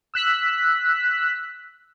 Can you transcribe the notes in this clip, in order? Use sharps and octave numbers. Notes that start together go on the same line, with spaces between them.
E6 F#6 B6